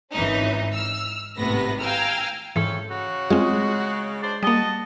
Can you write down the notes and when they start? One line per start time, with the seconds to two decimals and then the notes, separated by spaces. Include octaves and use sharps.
0.12 G#1 E3 C#4 D#4
0.75 E6 F6
1.38 G#1 A2 C3 B3 B4 A#6
1.80 F5 G5 G#5 A#5 E6 F6
2.56 F2 G#2 E3 C#4 A4
2.90 C#3 F#4
3.30 G#3 C4 F4
4.22 D4 C5 D5
4.43 G3 A#3 F#4 D#5 A5